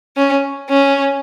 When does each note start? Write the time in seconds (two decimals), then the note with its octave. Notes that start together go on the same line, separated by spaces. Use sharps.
0.17 C#4
0.70 C#4